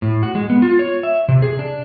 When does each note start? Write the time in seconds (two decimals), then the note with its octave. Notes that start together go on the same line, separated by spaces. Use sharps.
0.02 A2
0.23 F#4
0.35 G#3
0.50 B3
0.62 F4
0.79 C#5
1.03 E5
1.28 C3
1.42 G#4
1.59 D4